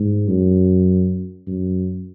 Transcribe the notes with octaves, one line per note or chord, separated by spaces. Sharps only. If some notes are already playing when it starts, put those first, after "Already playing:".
Already playing: G#2
F#2
F#2